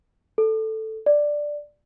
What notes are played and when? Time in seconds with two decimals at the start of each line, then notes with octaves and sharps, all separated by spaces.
0.38 A4
1.06 D5